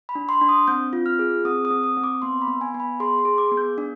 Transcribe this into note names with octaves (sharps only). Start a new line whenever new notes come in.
B5
D4
C6
D4
D#6
C4 G6
F4
F6
G#4
C4 D#6
D#6
C4
D#6
C4
D6
B3 C6
B5
B3
G#5
B3
B5
G#4 C6
C6
G#4
D6
B3
G6
D4